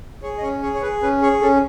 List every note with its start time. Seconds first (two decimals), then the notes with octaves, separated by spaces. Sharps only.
0.23 G#4 C#5
0.38 D#5
0.42 C#4 C#5
0.62 G#4 C#5
0.74 C#5
0.82 G#4 B4
1.02 C#4 B4
1.22 G#4 C#5
1.41 C#4 A4